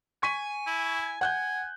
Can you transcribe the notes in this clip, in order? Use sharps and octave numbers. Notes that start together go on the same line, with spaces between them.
G#5 C#6 B6 D#7
E4
F#5 G#5 F#6 G6